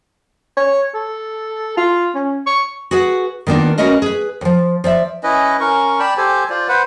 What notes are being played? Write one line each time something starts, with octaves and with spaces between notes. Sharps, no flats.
C#5
A4
F4
C#4
C#6
F#4 G#4 B4 F#5
D#3 A#3 B3 D4 F4
C#4 F#4 A#4 B4 D#5 F5
G#4 B4
D#2 F3
F3 D5 E5
C#4 E4 B4 D#5
C#4 A#4 C#6
D5 G5 A5 B5
G4 A4 C5 G#5
F4 C5 D5
B4 C5 F#5